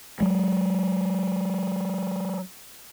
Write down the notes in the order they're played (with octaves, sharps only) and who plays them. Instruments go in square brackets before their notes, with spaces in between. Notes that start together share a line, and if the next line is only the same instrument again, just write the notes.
[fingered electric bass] F#3 G#3